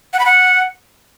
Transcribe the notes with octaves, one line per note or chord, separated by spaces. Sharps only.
F#5
B5
F#5